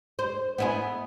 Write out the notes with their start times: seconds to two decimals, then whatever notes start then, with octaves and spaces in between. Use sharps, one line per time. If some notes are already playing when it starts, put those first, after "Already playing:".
0.19 C5
0.58 B3 E4 G#4